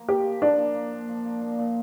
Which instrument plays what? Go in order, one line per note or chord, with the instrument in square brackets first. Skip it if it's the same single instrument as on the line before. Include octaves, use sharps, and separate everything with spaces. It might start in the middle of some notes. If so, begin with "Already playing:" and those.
Already playing: [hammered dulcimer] F3 A#3
[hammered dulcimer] A#2 [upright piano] G4
[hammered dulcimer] A#2
[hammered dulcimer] F3 [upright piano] D4
[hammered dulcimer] A#3
A#2
A#2
F3
A#3
A#2
A#2